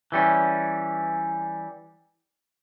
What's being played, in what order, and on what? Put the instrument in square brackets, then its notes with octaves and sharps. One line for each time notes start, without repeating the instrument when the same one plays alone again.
[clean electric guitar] E3 G3 C#4